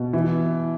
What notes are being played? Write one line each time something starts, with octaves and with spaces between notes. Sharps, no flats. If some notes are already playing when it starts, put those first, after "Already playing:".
Already playing: B2
E3